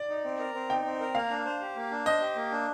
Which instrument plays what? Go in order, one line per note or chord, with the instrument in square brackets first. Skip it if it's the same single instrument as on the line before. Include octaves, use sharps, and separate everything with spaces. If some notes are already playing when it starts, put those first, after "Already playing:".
Already playing: [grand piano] D5
[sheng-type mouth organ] D#4
C4
A#4
C4
[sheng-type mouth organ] D#4 [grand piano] G5
[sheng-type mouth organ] C4
A#4
[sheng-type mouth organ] A#3 [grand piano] F5
[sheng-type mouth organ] D4
C5
G4
A#3
D4
[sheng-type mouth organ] C5 [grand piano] D#5
[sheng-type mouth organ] G4
A#3
D4